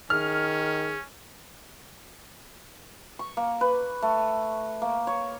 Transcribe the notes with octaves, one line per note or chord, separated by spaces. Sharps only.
D#3 C#4 G#4 F6
C#6
A#3
B4
A3
A#3
C#5